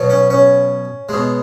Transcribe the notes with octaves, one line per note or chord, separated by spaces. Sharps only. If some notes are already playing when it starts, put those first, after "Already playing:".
Already playing: B2 F#3
C#4
C#4
B2 G#3